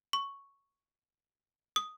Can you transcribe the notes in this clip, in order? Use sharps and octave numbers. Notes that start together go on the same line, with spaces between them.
C#6
D#6